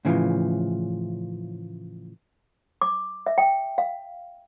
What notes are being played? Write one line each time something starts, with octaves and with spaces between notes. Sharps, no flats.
A2 C#3 E3 F3
D6
E5
G5
F5